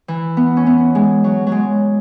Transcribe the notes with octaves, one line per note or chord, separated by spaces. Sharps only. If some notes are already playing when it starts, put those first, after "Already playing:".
E3
B3
C#4
B3
G#3
F#3
F#3
G#3